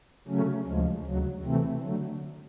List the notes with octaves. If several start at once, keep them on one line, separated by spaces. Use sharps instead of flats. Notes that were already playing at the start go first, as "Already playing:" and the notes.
C#3 F#3 A3 C#4
D2 C#3 F3 G#3
D2 C#3 F#3
C3 E3 A3 C4
D3 F#3 A3